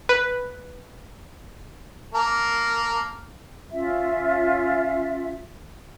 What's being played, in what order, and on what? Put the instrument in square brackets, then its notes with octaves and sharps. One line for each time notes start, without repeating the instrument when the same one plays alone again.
[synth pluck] B4
[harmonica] A#3 A#4 A5
[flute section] C#4 F4 E5